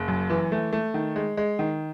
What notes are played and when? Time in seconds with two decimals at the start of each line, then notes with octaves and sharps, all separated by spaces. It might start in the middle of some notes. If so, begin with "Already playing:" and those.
Already playing: F#1
0.08 F#2
0.30 E3
0.52 A3
0.73 A3
0.94 D#3
1.16 G#3
1.37 G#3
1.59 D#3